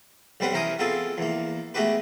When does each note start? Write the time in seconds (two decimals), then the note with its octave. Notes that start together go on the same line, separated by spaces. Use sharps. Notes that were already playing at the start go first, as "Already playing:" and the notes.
0.40 B1 G3 C4 B4 C5 F#5
0.53 E3 C#4 A#4 C5 G#5 D#6
0.79 B3 C4 F4 G#4 A4 C#5
1.18 E2 A#3
1.74 G#3 A3 B3 F#4 G4 B4